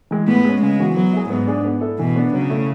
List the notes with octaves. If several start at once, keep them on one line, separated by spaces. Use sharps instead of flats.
E3 G#3
A2 B3
G#3 C#4
C#3 G#3
E3 B3 F#4
F#3 B3
E4 G#4
G#2 B3
D4 G#4 D5
B3
E4 A4
B2 E3
B3 D4
C#3 F#3
A3 E4